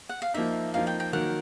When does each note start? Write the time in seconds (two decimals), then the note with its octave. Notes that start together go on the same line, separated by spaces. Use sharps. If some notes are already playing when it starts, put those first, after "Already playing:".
0.09 F#5
0.22 F5
0.34 F3 A#3 D#4 E5
0.74 F3 A#3 D#4 F5
0.87 G5
1.00 G5
1.13 D#3 F#3 A#3 F#5